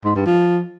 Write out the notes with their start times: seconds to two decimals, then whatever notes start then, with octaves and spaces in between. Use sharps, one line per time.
0.05 G#2
0.15 G2
0.26 F3